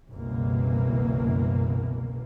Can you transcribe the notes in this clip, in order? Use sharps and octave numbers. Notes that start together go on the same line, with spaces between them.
F#1 C2 B2 E3 A#3